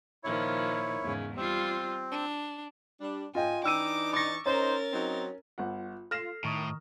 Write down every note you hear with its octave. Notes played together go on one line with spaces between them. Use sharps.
A#2 D#3 F3 E4 C#5
E2 G#2 C#3
G3 C4 F4
D4
G3 D4
G#2 F4 D#5 G5 G#5
E3 D4 D#4 G5 D6 E6 D#7
C#6 D6 A6 A#6
C#4 D#4 A#4 C5 A6
F#3 C4 D#4
G1 F4 F#5
F4 A4 F6 A#6 C7 E7
A2 D#3 A#5 C#6 D#6